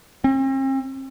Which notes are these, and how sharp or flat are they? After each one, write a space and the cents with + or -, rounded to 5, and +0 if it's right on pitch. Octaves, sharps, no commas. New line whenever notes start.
C4 +45